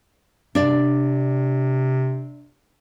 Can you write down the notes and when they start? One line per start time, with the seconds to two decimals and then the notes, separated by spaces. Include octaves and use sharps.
0.55 C3 D4 D5